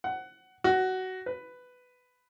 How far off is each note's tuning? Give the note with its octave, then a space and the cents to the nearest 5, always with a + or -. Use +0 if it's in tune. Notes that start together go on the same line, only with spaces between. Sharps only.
F#5 +15
F#4 +15
B4 +10